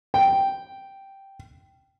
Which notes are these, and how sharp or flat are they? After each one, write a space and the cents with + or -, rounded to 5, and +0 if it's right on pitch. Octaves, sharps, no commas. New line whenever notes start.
G5 -5